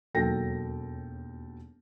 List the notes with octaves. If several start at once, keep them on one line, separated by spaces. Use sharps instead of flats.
E1 D#2 F#3 A4 G5 A#6